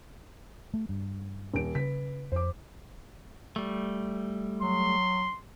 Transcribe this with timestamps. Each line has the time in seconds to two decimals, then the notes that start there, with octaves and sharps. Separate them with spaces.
0.74 A3
0.89 G2
1.54 D#1 D7
1.75 C#3 B4 B6
2.32 F2 C5 D6
3.56 G3 A3
4.62 F#3 C6